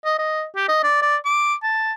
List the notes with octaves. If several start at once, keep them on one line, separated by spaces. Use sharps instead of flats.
D#5
D#5
G4
D#5
D5
D5
D6
A5